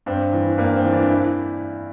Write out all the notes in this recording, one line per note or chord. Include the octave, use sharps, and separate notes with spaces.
G2 C4
E3
G2 A#3
C4
E3
D4
E4